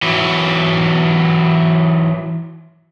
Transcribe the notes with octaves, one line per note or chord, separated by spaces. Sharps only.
E3 F#3